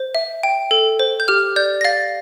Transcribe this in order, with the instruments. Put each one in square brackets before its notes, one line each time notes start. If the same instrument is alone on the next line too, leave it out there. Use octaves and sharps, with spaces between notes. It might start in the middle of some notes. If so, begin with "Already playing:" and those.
Already playing: [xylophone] C5
E5
G5
A4
C5
G6
G4 F6
D5 G6
A#6
F5 A6